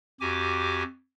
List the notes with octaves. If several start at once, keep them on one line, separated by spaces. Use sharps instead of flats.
F2 F#4 G4 G#5 D6